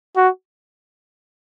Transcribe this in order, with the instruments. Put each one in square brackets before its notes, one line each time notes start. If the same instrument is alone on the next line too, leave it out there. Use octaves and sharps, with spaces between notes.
[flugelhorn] F#4